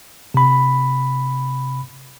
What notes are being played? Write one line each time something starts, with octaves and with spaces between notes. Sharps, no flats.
C3 B5